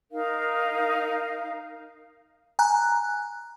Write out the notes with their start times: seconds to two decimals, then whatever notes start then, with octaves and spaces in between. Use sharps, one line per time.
0.11 D#4 A#4 F5
2.59 G#5 A#5 F#6